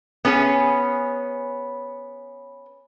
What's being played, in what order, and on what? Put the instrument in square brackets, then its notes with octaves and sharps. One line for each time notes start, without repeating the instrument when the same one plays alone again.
[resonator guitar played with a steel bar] B3 C#4 G#4 G#5